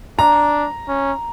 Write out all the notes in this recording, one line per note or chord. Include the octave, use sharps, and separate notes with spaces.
D4 A#5
C#4